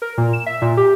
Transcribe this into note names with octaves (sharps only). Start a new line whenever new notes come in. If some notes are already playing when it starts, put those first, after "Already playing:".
A#4
A#2
E7
E5
A#2
G4